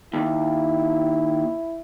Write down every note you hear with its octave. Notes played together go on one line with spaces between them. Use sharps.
D#2 E4